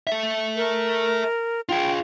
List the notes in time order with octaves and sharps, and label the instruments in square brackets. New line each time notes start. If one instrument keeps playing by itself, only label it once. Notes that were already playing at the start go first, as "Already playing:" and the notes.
[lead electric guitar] A4 E5
[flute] A#4
[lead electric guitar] F4 G#4 [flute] G5